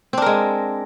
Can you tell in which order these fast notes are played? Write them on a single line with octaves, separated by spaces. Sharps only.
C4 D4 A#4 G#3